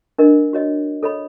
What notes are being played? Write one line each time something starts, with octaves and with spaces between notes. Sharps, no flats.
D4 A#4 D#5
F#4 C#5 D#5
A4 C#5 D#5 B5